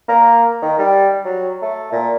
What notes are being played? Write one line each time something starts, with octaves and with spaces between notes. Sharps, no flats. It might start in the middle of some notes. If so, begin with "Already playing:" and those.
A#3
D#3
G3
F#3
A3
A#2